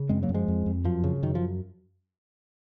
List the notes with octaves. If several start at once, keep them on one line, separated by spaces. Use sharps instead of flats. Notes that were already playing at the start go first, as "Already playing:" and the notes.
Already playing: C#3
F#2 G#3 C4
F#3 A#3
F#2
F3 G#3
F2
F2
F#2 F3
C#3
F#2 D#3
F3